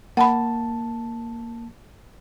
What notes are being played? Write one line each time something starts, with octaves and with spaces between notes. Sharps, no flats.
A#3 F#5 A5 B5